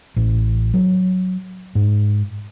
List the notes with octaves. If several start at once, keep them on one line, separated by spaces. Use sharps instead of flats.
A1
F#3
G#2